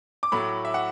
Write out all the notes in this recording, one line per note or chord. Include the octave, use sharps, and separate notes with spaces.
D6
A2 F#3 A3 B5
E5
F#5